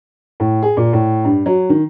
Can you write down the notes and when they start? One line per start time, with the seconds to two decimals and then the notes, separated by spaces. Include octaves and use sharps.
0.40 A2
0.63 G#4
0.77 A#2
0.93 A2
1.25 G2
1.46 F#3
1.69 D#3